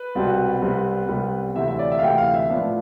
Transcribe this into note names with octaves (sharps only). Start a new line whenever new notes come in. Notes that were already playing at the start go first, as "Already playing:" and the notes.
Already playing: B4
C2 B2 G3 C4
C2 C3 G3 B3
C2 C3 G3 B3
D2 C3 E3 E5
E5
D5
E5
F5
D2 C3 E3 G5
F5
E5
A2 F3 B3 D4 F5